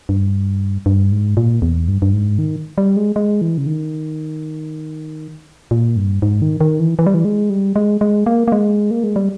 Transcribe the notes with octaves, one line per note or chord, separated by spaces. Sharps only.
G2
G2
G#2
A#2
E2
G2
G2
G#2
D#3
G3
G#3
G#3
E3
C#3
D#3
A#2
G2
G#2
D#3
D#3
E3
E3
G3
E3
G#3
G3
G#3
G#3
A#3
A#3
G#3
A#3
G#3
G3